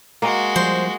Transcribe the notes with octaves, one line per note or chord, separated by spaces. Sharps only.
G#3 A#3 F#4 D#5
F3 G3 C5